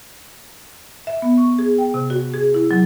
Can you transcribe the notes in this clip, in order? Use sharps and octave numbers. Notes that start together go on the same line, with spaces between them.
E5
B3
C#6
G#4
G5
C3
F#4
G#4
E4
F#3